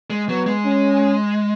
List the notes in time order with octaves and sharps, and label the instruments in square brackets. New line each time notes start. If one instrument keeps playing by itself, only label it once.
[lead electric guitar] G#3
[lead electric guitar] F#3 [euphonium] B3
[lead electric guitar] G#3
[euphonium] C#4